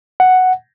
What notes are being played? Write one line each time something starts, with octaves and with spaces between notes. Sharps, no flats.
F#5